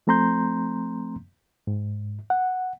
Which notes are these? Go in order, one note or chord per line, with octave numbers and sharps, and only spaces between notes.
F3 A3 C4 A#5 C6 G6
G#2
F#5